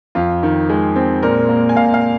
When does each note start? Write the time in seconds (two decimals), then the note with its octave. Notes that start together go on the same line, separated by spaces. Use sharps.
0.15 F2 F4
0.43 D#3
0.69 G#3
0.96 C4
1.23 A#2 A#4
1.49 A#3
1.69 G#5
1.76 A#2 F5
1.94 F5